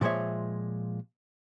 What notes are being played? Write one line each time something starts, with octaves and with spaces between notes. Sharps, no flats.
A#2 F3 G#3 C5 C#5 E5